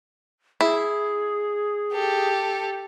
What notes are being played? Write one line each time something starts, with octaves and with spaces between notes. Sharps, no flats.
E4 G#4
G4 A4